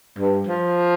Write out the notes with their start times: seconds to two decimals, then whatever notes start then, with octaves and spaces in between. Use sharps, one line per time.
0.19 G2
0.47 F3